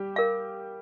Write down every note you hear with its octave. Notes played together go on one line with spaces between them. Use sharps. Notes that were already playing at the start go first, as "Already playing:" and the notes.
Already playing: G3 G4
A#4 F5